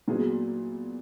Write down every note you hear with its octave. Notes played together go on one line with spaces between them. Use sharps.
A#2 F#3 B3 E4 G#4